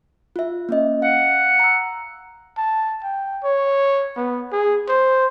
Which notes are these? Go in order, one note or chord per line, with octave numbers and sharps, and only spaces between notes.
F4 E5
A#3 C#4 D#5
F5 F#5
A#5 E6
A5
G5
C#5
B3
G#4
C5